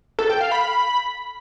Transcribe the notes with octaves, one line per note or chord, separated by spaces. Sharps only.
A4
G5
F5
B5